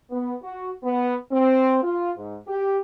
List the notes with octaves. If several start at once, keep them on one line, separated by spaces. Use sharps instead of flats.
B3
F#4
B3
C4
F4
G#2
G4